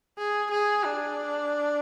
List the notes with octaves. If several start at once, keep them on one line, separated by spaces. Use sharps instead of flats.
G#4
G#4
D4